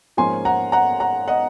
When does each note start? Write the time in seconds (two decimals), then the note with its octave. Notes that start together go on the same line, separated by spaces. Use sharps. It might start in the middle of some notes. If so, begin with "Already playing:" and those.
0.17 G#2 F3 A#3 C#4 G#5 C6
0.45 F#5 A#5
0.72 F#5 A#5
1.00 F#5 A#5
1.28 D#5 F#5